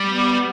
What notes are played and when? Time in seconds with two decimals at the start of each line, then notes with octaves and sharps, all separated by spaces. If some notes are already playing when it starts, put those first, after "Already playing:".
Already playing: G3
0.08 B3